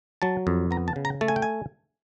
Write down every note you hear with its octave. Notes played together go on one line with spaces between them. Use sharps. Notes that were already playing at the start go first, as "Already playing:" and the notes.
F#3 A5
F2
B3 A#5
A5
C#3
A#5
A3 A5
G#5
G5
G#5